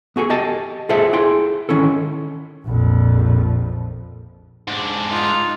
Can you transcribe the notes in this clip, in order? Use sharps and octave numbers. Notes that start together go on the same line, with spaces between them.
B3 F#4 G#4 A4
G4 D#5 G#5 A5
F4 G#4 A4 C5 E5
E4 G#4 G5 C6
D#3 C#4 E4 A4
A#1 F2
G#2 D4
D#4 F4